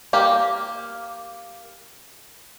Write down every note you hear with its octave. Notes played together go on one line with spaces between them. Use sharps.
A#3 G4